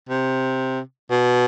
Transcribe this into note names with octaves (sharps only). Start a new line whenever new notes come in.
C3
B2